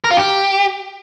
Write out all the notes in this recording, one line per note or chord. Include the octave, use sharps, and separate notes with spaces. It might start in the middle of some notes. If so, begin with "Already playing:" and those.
A#4
F4
G4